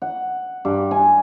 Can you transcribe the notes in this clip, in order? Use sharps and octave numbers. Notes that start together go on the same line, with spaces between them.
F#5
G2
G#5